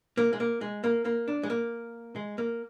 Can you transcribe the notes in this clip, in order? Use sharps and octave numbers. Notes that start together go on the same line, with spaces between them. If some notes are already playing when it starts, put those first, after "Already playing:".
A#3
G#3
A#3
G#3
A#3
A#3
D4
G#3
A#3
G#3
A#3